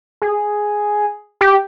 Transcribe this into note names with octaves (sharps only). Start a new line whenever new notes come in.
G#4
G4